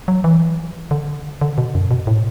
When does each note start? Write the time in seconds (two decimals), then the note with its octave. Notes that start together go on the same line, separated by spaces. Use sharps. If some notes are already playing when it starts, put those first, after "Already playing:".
0.08 F#3
0.24 E3
0.91 D3
1.41 D3
1.58 B2
1.75 F#2
1.91 B2
2.07 A2